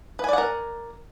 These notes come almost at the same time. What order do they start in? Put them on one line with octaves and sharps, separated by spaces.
B4 G#5 D5 F#5 A#4